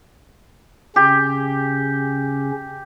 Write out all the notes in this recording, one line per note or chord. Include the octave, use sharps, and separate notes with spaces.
C#3 C#4 G4